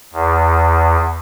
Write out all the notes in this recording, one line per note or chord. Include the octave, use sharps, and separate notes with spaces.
E2